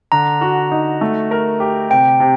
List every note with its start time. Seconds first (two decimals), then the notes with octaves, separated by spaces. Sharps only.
0.12 D3 A#5
0.41 F#4
0.71 D#4
1.01 A3
1.31 A#4
1.60 G4
1.90 C3 G5
2.20 C3